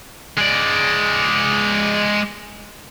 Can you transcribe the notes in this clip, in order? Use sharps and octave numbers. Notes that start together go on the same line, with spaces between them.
G#3 D5